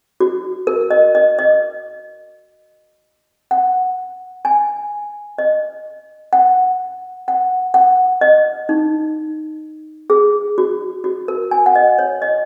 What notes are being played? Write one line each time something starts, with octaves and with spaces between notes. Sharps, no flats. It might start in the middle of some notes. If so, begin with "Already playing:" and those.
F#4
A#4
D#5
D#5
D#5
F#5
G#5
D#5
F#5
F#5
F#5
D#5
D#4
G#4
F#4
F#4
A#4
G#5
F#5
D#5
C#5
D#5